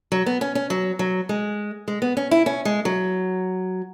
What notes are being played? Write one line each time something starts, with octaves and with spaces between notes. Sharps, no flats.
F#3
B3
C#4
C#4
F#3
F#3
G#3
G#3
B3
C#4
E4
C#4
G#3
F#3